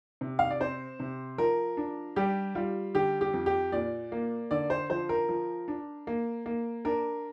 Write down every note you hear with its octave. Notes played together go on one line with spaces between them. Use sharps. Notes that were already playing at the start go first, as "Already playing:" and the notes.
C3
F5
D5
C4 C5
C3
F3 A#4
D4
G3 G4
G3 F4
D3 G4
G4
F2
G4
A#2 D5
A#3
D3 D5
C5
F3 C5
A#4
F3
D4
A#3
A#3
D4 A#4